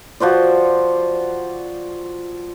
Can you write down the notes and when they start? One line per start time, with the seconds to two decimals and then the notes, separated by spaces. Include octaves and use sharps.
0.20 F3 F#4 C5 D5